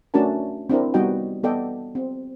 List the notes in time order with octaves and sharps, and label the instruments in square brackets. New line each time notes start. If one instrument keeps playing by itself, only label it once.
[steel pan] A3 C#4 D4 F#4 A#4 A5
C4 D4 E4 A#4
G3 B3 D#4 F#4 D#5 G5
B3 A4 D5 D#5 G5
C4